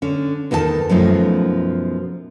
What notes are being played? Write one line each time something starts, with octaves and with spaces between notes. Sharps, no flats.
D3 C#4
E2 D#3 A4 D5 A5
F#2 B2 F3 A3 D#4